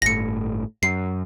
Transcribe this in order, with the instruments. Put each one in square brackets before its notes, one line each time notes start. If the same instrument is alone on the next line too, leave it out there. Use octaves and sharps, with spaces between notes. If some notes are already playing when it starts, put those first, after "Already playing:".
[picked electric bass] G1 A2 [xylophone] A#6 C#7
[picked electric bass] F#2 [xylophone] C7